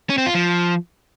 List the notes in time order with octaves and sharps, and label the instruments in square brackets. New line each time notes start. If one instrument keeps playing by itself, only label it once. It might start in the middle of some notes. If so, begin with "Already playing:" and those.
[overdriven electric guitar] C#4
C4
F4
F3